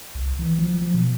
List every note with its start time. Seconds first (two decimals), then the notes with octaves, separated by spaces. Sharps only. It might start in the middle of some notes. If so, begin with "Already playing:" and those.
0.15 C2
0.39 E3
0.59 F3
0.78 F3
0.94 B2